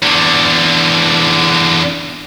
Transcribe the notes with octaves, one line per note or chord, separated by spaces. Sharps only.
E2 D3